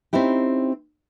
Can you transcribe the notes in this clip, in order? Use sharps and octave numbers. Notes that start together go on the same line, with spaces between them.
C4 C#4 D#4 E4 G4